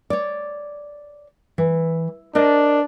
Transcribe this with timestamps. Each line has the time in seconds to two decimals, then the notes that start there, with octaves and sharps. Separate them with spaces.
0.10 C#5 D5
1.58 E3
2.35 D4 A#4 C5 D#5